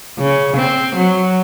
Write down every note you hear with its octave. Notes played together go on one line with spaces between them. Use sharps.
C#3
C4
F#3